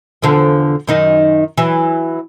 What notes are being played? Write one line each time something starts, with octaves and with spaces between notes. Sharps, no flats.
E2 D3 F3
F#2 D#3 D#4
E3 F#3